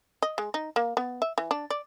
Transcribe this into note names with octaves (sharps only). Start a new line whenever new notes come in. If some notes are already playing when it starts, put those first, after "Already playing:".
D#5
G#3
D#4
A#3
B3
E5
E3
D4
D5